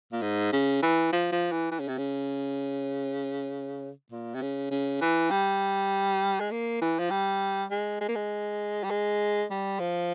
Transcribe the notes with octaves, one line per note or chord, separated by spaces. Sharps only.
A#2
G#2
C#3
E3
F3
F3
E3
E3
C#3
C3
C#3
A#2
C3
C#3
C#3
E3
G3
G#3
A#3
E3
F3
G3
G#3
G#3
A#3
G#3
G3
G#3
G3
F3